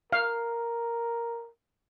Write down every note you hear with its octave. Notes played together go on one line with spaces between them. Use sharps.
A#4 F5